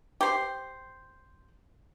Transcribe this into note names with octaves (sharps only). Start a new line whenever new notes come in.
G4 C5